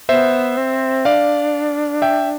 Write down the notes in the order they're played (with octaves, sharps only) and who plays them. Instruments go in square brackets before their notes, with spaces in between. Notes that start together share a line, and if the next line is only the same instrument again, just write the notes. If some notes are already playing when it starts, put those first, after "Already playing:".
[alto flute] B3 [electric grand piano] C5 E5
[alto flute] C4
[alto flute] D4 [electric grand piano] D5 F5
[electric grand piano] E5 G5